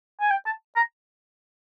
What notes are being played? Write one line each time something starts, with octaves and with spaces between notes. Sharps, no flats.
G#5
G5
A5
A#5